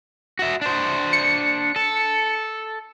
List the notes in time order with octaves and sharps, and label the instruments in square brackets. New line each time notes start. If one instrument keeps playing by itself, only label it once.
[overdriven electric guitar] F#4 E5
D4 C5
[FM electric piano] C#7
[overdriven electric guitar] A4